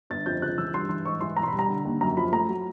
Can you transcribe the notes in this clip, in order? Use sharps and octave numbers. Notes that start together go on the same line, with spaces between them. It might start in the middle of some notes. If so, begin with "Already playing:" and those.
G1 A6
F2 G6
C#2 F#6
E3 E6
G2 C6
E3 C6
G#2 C#6
E3 C6
E1 A#5
C6
B5
G3
A#5
D3
D#2
F#2 A#5
F3 B5
A3 A#5
F#3